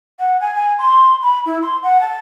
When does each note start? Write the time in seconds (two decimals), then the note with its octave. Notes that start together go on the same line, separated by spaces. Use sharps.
0.19 F#5
0.41 G#5
0.54 G#5
0.78 C6
1.22 B5
1.46 E4
1.62 C6
1.83 F#5
2.01 A5